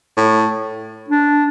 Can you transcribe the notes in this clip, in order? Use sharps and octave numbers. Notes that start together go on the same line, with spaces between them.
A2
D4